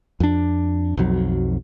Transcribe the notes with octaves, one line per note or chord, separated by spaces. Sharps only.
F2 D4
B1 F2 F#3